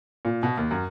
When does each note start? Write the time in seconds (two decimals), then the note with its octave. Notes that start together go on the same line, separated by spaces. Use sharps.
0.25 A#2
0.43 B2
0.57 D#2
0.71 F#2